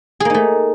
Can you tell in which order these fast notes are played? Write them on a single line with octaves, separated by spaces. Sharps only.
G#4 A#3 D#4 A3